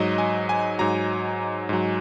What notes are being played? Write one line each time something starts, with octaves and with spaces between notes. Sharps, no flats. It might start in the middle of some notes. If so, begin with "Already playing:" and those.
Already playing: G#2 F#3 D#5
G#5
G#5
G#2 F#3 A#5
G#2 F#3